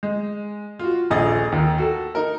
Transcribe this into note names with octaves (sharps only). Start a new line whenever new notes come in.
G#3
F4 F#4
D#1 A#1 G#4 D#5 A6
D#2 D#3
F#4 A4
D#4 A#4